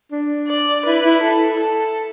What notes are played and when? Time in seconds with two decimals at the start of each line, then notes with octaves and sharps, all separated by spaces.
0.12 D4
0.48 D5
0.85 E4 B4
1.05 E4
1.23 A4
1.60 A4